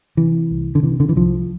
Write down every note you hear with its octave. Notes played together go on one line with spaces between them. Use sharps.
C3 E3
C2
D3
C3 E3
D3
E3
C2 F3